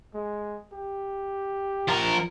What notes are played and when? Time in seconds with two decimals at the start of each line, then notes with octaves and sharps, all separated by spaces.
0.14 G#3
0.73 G4
1.88 F3 A#4